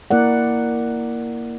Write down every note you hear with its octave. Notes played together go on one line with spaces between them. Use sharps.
A#3 E4 A#4 D5 F#5